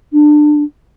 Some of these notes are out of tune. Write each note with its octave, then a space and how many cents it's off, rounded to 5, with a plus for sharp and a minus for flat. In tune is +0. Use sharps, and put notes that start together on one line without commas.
D4 +25